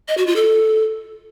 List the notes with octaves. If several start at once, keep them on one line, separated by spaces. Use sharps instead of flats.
D#5
F#4
F4
A4